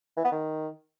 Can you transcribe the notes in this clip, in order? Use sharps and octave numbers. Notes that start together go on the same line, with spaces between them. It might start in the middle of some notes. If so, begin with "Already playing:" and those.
E3
B3
D#3